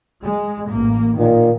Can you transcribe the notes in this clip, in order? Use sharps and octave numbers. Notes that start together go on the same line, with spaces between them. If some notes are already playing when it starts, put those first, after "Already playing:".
G#3
A1 A#3
A#2 D#3